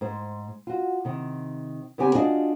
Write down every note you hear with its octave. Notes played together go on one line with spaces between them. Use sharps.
G#2 C5
F4 F#4
C3 D#3
C#3 B3 C4 G4 G#5
D4 F4 F#4 G#4 D5 D#5